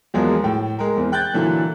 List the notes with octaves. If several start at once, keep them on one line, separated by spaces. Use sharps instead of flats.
E2 F3 F#3 G#3 A#3
A2 G5
G#3 A#4
E2 E3 C4
G5 F#6 G6 A6
A#2 D3 E3 F#3